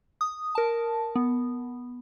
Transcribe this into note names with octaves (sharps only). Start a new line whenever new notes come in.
D#6
A#4 A5
B3